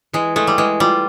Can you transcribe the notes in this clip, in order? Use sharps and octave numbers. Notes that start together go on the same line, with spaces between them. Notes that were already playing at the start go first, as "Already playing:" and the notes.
E3 G#3
G#3 A3
G3
E3 G#3
G3 F4